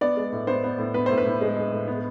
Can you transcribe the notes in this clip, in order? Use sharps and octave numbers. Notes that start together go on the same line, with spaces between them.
B3 D5
G#3
A2
B3 C5
B3
A2
B3 B4
A2 C5
B4
A2
G#3
G#3
A2
B3